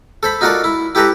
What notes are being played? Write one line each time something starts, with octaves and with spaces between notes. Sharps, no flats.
A4 C5 B5
D#4 F4 F#4 A4 A#4 D5
E4
E4 G4 A4 B4 A#5